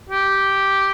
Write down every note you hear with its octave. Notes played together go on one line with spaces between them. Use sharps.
G4